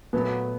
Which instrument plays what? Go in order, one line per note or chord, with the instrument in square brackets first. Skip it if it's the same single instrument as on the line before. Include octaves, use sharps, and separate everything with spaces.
[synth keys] A#2 F#3 A3 [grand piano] B3